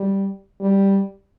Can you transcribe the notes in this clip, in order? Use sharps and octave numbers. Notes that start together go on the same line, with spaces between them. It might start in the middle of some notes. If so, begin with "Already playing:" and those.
Already playing: G3
G3